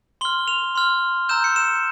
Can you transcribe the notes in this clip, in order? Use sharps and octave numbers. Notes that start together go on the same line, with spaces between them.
C6 F6 G7
F7
C6 F6
A#5 E6 G6 E7
C#7
E7